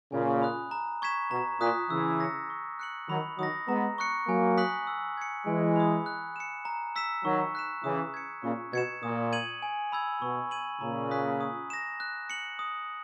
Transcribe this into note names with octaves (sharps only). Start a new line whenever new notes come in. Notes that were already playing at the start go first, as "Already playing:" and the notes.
A#2 C#3 G#5
B5 D#6 F#6
A#5
C#6 G#6 B6 E7
B2 A#5
A#2 D#6 F#6 B6
C#3 E3 E6
A#6 C#7
C#6
F#6 C#7 F#7
D#3 F#3 B5
D#3 F#3 D#6 A#6
G#3 B3 A#5
C#6 F#6 C#7
F#3 A#3 G#5
D#6 F#6 B6 F#7
E6
G#6 C#7
E3 G#3 G#5
B5 D#6
F#6
C#7 E7
A#5
E6 B6 E7
D#3 F#3 C#6
F#6 B6 E7
C#3 E3 D#6
G#6 C#7
A#2 C#3 C#6
B2 G#6 C#7 E7
A#2 D#6
G#6 D#7 F#7
G#5
B5 E6 G#6
B2 C#6
G#6 D#7 F#7
A#2 C#3 A#5
D#6 F#6 B6
D#6
A#6 E7
F#6
C#7 F#7
D#6